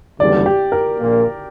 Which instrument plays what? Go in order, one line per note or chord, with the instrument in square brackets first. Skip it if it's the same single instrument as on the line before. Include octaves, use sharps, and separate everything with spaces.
[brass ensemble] F#1 E2 D3 G3 [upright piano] D5
[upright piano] G4
A#4
[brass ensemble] A#1 A#2 A#3